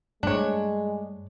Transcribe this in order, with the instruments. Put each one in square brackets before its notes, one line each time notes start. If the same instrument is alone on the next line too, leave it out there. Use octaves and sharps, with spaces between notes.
[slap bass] G2 A3 [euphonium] G#3 [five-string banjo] D4 C#5